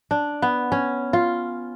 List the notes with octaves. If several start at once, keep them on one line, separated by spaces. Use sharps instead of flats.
D4
B3
C#4
F4